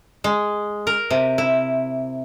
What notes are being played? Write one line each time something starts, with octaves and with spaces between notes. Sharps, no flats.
G#3
A#4
C3
E4